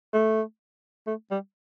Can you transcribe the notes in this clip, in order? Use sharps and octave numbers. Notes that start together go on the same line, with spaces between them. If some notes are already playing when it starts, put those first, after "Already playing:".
A3
A3
G3